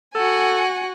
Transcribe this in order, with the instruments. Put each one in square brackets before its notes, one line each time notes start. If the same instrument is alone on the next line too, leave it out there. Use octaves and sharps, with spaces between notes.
[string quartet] F#4 F#5 G#5 [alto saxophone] A4